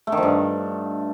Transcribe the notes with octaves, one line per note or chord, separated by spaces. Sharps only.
A3
D#3
F3
G2